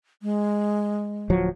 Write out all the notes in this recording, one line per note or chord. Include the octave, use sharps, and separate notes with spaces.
G#3
D1 F3 F#3